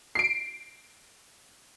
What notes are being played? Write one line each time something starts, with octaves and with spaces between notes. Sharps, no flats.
C7 D7